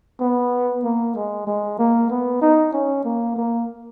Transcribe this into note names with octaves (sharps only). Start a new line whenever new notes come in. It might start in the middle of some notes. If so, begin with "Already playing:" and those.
B3
A#3
G#3
G#3
A#3
B3
D#4
C#4
A#3
A#3